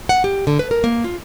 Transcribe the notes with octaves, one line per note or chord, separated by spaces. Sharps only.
F#5
G4
D3
B4
A#4
A#3
F4